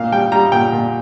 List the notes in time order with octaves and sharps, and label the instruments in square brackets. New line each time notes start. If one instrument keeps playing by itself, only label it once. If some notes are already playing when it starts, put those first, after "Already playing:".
Already playing: [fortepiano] A#2 F5
G3 G5
G3 A#5
A#2 G5
A#2